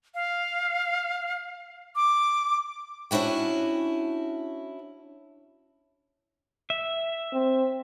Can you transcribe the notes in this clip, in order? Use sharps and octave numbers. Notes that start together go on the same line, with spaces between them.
F5
D6
C#4 D4 E4 F#4 G5
E5
C4